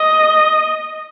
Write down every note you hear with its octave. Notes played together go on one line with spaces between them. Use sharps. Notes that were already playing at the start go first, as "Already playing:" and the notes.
Already playing: D#5